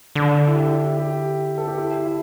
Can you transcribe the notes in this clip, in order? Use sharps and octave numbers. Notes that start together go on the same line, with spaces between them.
D3
E4
G4
G4
A4
G4
E4
E4